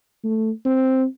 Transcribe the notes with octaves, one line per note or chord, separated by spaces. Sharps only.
A3
C4